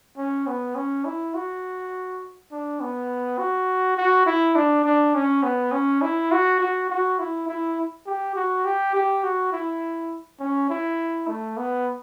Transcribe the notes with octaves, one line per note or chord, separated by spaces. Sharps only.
C#4
B3
C#4
E4
F#4
D4
B3
F#4
F#4
E4
D4
D4
C#4
B3
C#4
E4
F#4
F#4
F#4
E4
E4
G4
F#4
G4
G4
F#4
E4
C#4
E4
A3
B3